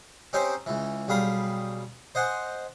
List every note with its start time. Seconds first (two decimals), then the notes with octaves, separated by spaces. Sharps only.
0.33 C4 C#4 D#4 G4 C5 C#5
0.66 C#2 E3
1.08 B1 G3 G#4 F5 B5 D#6
2.15 C5 D#5 F#5 G#5